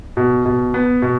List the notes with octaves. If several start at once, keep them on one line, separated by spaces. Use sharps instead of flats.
B2
B2
B3
B2